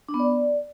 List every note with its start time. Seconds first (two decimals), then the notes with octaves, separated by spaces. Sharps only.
0.09 D4
0.14 B3
0.20 D5